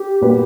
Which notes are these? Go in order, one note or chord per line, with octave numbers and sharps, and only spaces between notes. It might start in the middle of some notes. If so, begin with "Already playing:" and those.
Already playing: G4
A#2 G3 B3 F#4 B4